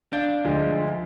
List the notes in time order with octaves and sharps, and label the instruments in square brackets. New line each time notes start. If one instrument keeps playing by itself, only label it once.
[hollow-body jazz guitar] D4 [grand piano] F5 G6
[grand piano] D2 F3 G#3